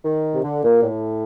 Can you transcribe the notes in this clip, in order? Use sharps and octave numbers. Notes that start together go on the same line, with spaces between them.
D#3
C3
D3
A#2
A2